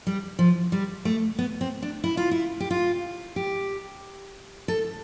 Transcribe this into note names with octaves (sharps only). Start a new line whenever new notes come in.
G3
F3
G3
A3
B3
C4
D4
E4
F4
E4
G4
F4
G4
A4